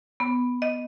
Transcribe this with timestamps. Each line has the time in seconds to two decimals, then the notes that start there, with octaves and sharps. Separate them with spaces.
0.20 B3
0.62 D#5